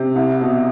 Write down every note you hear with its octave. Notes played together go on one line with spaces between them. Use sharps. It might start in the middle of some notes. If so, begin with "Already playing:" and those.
Already playing: C3
C2
B2